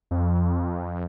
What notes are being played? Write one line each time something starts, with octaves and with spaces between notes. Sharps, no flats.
F2